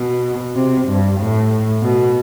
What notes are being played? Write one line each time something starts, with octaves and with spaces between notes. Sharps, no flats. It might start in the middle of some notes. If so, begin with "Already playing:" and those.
Already playing: B2
C3
G2
A2
B2